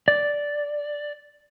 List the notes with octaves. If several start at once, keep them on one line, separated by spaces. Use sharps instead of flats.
D5